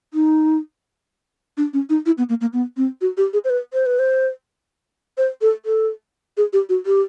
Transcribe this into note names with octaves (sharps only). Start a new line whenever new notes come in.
D#4
D4
C#4
D#4
E4
B3
A#3
A#3
B3
C4
F#4
G4
G#4
C5
B4
C5
B4
C5
C5
A4
A4
G#4
G4
F#4
G4